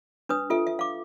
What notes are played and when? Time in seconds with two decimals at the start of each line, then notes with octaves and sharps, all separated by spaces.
0.29 D4 B4 D#6
0.50 F4 A4 E5
0.67 E5
0.79 F5 D6